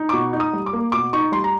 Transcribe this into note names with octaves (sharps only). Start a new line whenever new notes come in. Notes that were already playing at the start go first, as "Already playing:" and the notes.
Already playing: D#4
D6
B2 C#6
D#4
D#6
G3
D6
A#3
B2 D6
D#4 C#6
G3 C6
A#5